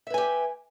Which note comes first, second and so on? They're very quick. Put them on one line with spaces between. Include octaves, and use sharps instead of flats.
E5 B4 G#5 G4